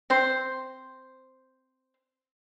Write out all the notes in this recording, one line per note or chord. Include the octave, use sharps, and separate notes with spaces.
C4 C5